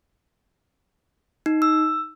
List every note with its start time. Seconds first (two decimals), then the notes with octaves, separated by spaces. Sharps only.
1.46 D#4
1.62 E6